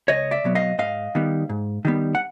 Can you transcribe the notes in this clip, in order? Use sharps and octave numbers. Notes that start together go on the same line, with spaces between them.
C#2 C#5 D#5
D5 E5
B2 F#3 B3
D#5 F5
G#2 D#5 F5
D#3 G3 B3
G#2
D#3 G3 B3
F#5